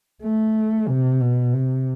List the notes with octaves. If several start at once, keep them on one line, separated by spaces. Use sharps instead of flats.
A3
C3
B2
C3